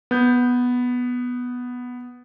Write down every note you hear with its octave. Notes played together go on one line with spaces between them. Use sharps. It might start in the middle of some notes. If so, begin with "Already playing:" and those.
B3 G6